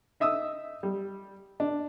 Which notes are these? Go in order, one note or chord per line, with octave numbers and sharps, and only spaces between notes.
D#4 E5 D#6 E6
G3
D4